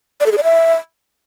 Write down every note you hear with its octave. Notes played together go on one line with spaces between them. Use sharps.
D5
A4
G#4
D5
E5